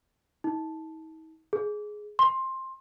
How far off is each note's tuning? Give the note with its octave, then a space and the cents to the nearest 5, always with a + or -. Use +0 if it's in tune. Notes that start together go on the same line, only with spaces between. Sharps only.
D#4 +45
G#4 +10
C6 +15